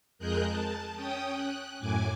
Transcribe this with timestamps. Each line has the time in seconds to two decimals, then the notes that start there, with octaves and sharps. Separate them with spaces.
0.18 F2 G#3 G#4 A#4 F#6 G6
0.48 A5
0.94 C#4 G5 D#6
1.32 F#6
1.79 F#2 A2 G#5 D6